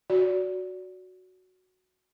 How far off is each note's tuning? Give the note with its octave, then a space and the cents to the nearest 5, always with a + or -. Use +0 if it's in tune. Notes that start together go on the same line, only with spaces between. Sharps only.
F#4 +0 D5 -30